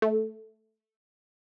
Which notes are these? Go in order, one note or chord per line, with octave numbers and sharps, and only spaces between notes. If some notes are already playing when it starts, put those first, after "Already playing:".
A3